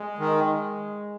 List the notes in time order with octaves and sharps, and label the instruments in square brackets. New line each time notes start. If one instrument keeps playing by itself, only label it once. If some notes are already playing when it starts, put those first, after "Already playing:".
Already playing: [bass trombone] G#3
[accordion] D#3